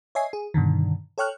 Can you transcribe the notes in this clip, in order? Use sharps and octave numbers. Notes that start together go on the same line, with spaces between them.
C#5 D#5 E5 G#5 C7
G#4
G2 B2 D3 D#3
A4 C#5 G5 C#6 F6 F#6